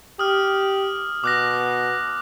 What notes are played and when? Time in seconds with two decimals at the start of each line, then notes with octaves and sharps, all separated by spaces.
0.19 G4 D#6 F6
1.24 B2 D6 F#6 A#6